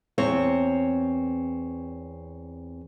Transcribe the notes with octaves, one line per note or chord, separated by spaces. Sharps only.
E2 C4 C#5